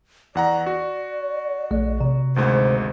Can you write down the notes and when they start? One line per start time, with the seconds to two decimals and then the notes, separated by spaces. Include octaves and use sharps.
0.35 E2 D5 F#5 A#5
0.66 F#4
1.71 A#1 A3
2.01 C3
2.36 G#1 D2 G#2 C5